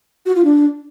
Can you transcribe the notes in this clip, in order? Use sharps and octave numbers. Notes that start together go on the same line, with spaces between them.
F#4
F4
D4